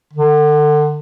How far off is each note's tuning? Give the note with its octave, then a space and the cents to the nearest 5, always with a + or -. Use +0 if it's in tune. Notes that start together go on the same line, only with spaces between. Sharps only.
D3 +30